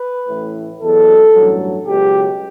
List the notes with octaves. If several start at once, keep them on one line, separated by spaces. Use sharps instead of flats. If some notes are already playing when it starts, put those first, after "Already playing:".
Already playing: B4
A1 A2 E3
E2 B2 F#3 A4
A1 G2 F#3
C#2 B2 F#3 G4